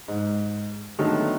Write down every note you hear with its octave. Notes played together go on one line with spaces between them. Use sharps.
G#2
D3 D#3 F#3 A3 B3